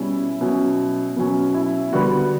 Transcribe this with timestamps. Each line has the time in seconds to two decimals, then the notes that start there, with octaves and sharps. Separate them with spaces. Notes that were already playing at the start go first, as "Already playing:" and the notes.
Already playing: B2 G3 C#4 E4
0.41 B2 F#3 C#4
1.16 B2 F#3 C#4
1.54 E4
1.92 D3 G3 B3 F#4